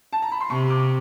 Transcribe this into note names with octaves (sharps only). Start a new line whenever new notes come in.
A5
A#5
B5
C6
C3 C#6
D6